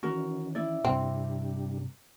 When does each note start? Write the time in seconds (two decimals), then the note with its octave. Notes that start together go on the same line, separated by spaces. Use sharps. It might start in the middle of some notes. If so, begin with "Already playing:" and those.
0.03 D#3 E3 C#4 F#4 A#4
0.55 E4 D5
0.85 G2 C3 G3 C4 D4 G4